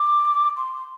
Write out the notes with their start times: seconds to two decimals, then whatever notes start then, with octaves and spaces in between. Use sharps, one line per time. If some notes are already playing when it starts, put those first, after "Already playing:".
Already playing: D6
0.57 C6